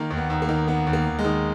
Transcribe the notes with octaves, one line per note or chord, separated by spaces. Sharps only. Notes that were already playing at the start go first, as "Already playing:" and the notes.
Already playing: D#3 A#3
D#2
B3
D#2
A#3
D#3
D#3 B3
D#2
A#3
D#2
G#3
D#3